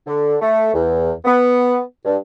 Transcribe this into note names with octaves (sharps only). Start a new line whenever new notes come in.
D3
A3
E2
B3
G2